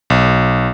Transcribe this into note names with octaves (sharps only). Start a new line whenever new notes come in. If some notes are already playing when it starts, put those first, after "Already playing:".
B1